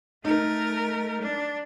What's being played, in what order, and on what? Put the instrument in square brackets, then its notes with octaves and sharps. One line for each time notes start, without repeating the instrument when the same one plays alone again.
[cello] A3 A#4 [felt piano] D#4
[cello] D4